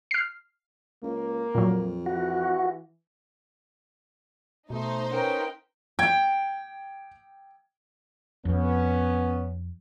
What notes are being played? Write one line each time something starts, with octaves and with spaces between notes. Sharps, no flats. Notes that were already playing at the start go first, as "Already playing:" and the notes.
F6 C7
C#2 A#3
F2 A#2 F#3
E3 F#4
B2 A3 D#4 C5
C#4 A#4 B4 G5
G5 G#6
F2 B3 C#4